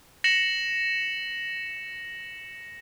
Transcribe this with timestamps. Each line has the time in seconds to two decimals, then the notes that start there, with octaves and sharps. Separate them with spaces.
0.24 A#6 C#7 E7 F#7